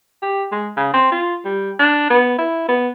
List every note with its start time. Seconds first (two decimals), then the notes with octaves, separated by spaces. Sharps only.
0.22 G4
0.52 G#3
0.77 C#3
0.94 C4
1.12 F4
1.45 G3
1.79 D4
2.10 B3
2.38 E4
2.68 B3